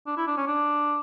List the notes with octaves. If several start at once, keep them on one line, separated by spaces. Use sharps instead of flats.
D4
E4
D4
C#4
D4